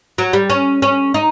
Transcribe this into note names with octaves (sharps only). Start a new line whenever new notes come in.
F#3
G3
C#4
C#4
D#4